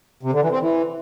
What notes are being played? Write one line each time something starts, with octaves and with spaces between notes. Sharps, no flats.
C3
D3
E3
C4
E3